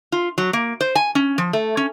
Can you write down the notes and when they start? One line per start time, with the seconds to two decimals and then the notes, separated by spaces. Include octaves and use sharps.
0.12 F4
0.38 F#3
0.53 A#3
0.81 C5
0.95 G#5
1.15 C#4
1.38 F3
1.53 A3
1.77 C#4